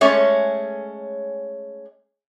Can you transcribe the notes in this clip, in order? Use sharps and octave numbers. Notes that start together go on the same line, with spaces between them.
G#3 A3 C#4 C#5